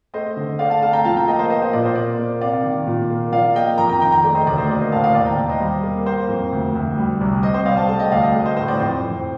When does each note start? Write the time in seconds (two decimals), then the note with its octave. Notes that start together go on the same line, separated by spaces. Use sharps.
0.14 A3 C5 D#5
0.37 D3
0.59 A3 D5 F5
0.70 F5 A5
0.82 A3 F5 A5
0.93 G5 A#5
1.04 F3 F5 A5
1.16 G5 A#5
1.27 A#3 D#5 G5
1.39 C5 D#5
1.50 A#3 C5 D#5
1.62 C5 D#5
1.73 A#2 D5
1.85 C5
1.95 A#3 D5
2.19 A#3
2.41 C3 D5 F5
2.64 D#3
2.87 A#2
3.10 A#3
3.32 F3 D5 F5
3.55 A#3 D#5 G5
3.78 F2 G5 A#5
3.89 G5 A#5
4.01 D#3 G5 A#5
4.12 G5 A#5
4.23 A3 D5
4.35 C5 D#5
4.47 D2 D5
4.58 C5
4.69 A#3 D5
4.80 C5 D#5
4.92 A2 F5 A5
5.04 D5 F5
5.15 D#2 D5
5.26 G5 A#5
5.37 D#2
5.49 C5 D#5
5.60 G3
5.83 A#3
6.06 A#3 C5
6.29 F2
6.52 D2
6.75 D2
6.97 G3
7.21 C2
7.43 C3 C5 D#5
7.54 C5 D#5
7.65 G3 D5 F5
7.77 F5 A5
7.88 A3 F5 A5
7.99 D#5 G5
8.12 D2 D5 F5
8.22 D#5 G5
8.34 A3
8.45 C5 D#5
8.57 A2 C5
8.68 D5
8.80 F2 C5
9.02 F2